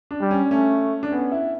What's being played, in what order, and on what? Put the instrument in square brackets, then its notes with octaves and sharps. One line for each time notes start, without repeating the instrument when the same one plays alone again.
[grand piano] D4
[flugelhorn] G3
[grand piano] C#4
[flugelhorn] A3 [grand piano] C#4
[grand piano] D4
[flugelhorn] B3 [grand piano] C#4
[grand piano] E4